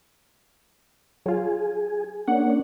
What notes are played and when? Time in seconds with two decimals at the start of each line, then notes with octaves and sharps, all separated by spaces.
1.26 F#3 F4 G#4
2.28 A#3 C#4 D4 F#5